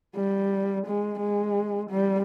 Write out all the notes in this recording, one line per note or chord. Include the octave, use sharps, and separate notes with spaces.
G3
G#3
G#3
G3